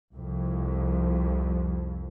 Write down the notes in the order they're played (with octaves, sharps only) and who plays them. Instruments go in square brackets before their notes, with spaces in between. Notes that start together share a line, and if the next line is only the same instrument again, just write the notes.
[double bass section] C2 F2